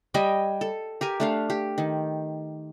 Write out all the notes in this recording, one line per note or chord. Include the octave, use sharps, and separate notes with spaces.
G3 D#5 G5 G#5
A4
G4 A#4 G#5
A3 D4 F5
G4
D#3